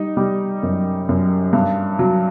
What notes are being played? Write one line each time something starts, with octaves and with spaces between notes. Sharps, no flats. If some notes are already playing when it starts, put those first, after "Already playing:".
Already playing: G3 D#4
G3
F#2
F#2
G2
F#3